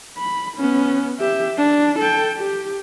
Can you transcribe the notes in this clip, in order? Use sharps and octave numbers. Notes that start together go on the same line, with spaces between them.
B5
B3 C#4
G4 E5
D4
A4 G5
G4